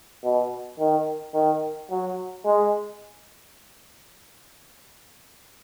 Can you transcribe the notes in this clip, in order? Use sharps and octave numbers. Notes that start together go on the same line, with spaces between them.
B2
D#3
D#3
F#3
G#3